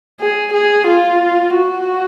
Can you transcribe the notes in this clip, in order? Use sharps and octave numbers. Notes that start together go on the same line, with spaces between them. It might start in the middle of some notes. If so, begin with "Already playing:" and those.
G#4
G#4
F4
F#4